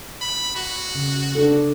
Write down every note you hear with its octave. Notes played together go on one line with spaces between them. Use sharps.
B5
F#4
C#3
D4 A4